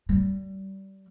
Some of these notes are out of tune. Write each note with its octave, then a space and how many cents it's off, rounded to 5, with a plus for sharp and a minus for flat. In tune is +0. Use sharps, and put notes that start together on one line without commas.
G3 -25